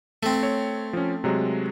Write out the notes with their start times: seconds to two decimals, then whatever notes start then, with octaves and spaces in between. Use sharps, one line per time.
0.23 A3 C4
0.43 C#5
0.93 F3 C#4
1.24 C3 F#3 G#3